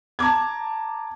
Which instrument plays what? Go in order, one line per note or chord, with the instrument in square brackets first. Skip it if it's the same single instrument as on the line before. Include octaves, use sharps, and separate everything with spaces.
[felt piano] A5 A#5 D6 G#6